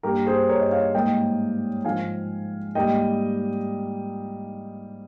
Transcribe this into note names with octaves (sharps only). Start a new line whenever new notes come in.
G2 G3 A#3 G4 A#4
G#4 C5
A#4 C#5
D#5
C#5 F5
G#2 G3 A#3 D#5 G5
G#2 F3 G#3 F5 G#5
G#2 G3 A#3 D#5 G5